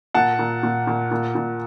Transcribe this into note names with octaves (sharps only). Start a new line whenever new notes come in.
A#2 F#5 A5
A#2
A#2
A#2
A#2
A#2